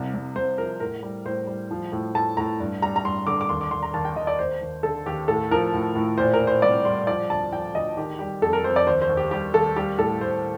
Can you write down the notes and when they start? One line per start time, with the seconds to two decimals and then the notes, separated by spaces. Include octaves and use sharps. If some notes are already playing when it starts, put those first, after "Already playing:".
Already playing: C2 C3
0.14 C2
0.35 C2 C5
0.58 F3 A#4
0.80 A2 A#4
1.03 G3
1.25 A2 C5
1.47 G3
1.71 F3
1.92 A2
2.15 A2 A5
2.37 A2 A#5
2.60 G2
2.82 G3 A#5
2.96 A#5
3.05 G2 C6
3.27 D3 D6
3.41 D6
3.49 D#2 C6
3.61 D6
3.71 D#2 C6
3.83 A#5
3.94 D#2 A5
4.05 G5
4.16 D#2 D#5
4.27 D5
4.39 D#2 C5
4.61 D#2
4.83 D3 A4
5.06 D#2 G4
5.28 A2 A4
5.51 F3 A#4
5.73 A2
5.95 A2
6.18 A#2 C5
6.34 A#4
6.40 A#2
6.47 C5
6.62 C2 D5
6.85 G3 C6
7.07 F3 D5
7.30 D2 A5
7.52 F3 G5
7.75 D2 D#5
7.97 D#3 G4
8.19 G3 G4
8.42 F2 A4
8.53 A#4
8.64 F2 C5
8.76 D5
8.87 D#2 C5
9.02 C5
9.09 D#2
9.17 G4
9.31 G3 G4
9.54 D#2 A4
9.76 G3 G4
9.98 A2 A4
10.21 A2 C5